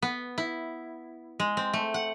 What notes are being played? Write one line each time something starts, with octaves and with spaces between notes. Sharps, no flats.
B3
E4
G#3
C4
A3
F#5